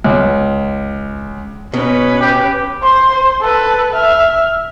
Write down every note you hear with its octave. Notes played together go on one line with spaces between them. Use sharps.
C#2
B2 C#4 B4
G4
C5 C6
A4 B4
E5 F6